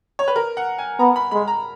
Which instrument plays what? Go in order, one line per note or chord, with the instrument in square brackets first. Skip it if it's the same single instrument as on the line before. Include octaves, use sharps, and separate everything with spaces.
[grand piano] C#5
B4
A#4
F#5
G#5
[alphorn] B3 [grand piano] A#5
[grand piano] B5
[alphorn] G#3 [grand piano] B5
[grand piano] A#5